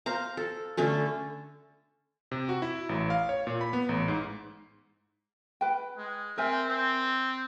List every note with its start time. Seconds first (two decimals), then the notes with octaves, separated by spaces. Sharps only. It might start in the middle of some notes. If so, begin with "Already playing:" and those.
0.06 C5 F5 A#5
0.37 A4
0.77 D3 A3 C#4 A4
2.31 C3
2.49 F#4
2.62 E4
2.89 A1
3.10 F5
3.29 C#5
3.47 A#2
3.61 B5
3.73 B3
3.89 A1
4.08 G#2
5.61 B4 G5
5.98 G#3
6.37 C4 A#4 E5 G#5
6.69 C4